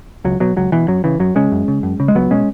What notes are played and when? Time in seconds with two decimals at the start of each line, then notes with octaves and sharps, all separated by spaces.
0.24 C#2 F#3
0.40 B2 F#3
0.56 C#2 F#3
0.72 B2 E3
0.88 F#2 F#3
1.04 C#3 E3
1.20 F#2 F#3
1.36 C#3 G#3 C#4
1.52 F#2
1.68 C#3
1.83 F#2
2.00 C#3
2.08 G#3
2.15 C#2 F#3 B3
2.31 B2 G#3 C#4